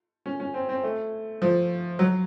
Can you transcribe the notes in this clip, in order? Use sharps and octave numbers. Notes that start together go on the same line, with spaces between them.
C#4
C#4
C4
C4
A3
F3
F#3